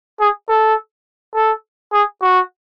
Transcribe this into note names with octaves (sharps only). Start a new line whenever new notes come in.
G#4
A4
A4
G#4
F#4